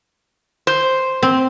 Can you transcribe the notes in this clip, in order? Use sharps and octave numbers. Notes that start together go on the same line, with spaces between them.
C5
C4